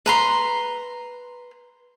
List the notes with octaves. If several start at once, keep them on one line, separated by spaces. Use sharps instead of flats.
B4 A#5 C6